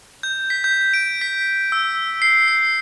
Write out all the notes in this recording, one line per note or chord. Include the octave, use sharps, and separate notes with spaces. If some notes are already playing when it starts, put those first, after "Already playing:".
G6
B6
G6
D7
B6
E6
C7
C7